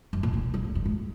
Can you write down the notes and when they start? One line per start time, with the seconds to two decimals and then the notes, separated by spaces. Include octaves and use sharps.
0.13 F#2
0.23 A#2
0.33 A#2
0.54 F#2
0.64 F2
0.75 F#2
0.85 G#2